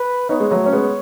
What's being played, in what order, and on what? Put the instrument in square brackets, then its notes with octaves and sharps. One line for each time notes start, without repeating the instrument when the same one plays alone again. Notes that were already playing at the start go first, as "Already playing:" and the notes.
Already playing: [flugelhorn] B4
[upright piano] B3 D#4 [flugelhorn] C#5
[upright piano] G#3
F#3 A3
C#4
G#3 B3